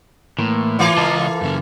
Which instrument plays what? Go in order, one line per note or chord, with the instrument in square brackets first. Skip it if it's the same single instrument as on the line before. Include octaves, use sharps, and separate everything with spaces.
[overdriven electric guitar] A2 [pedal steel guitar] E3 A#3 C6
[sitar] E3 A#3 F4 [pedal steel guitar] C#5
[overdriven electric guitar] C#2 D#5 [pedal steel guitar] A#4 F5 A5
[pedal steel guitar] A4
[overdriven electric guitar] F#2 C#3